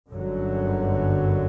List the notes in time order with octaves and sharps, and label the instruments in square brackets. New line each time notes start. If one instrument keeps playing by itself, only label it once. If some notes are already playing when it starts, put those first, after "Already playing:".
[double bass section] G1 F#2 D3 F#3